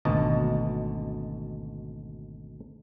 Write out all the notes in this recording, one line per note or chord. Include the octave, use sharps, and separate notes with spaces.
G#1 D2 B2 D#5 A5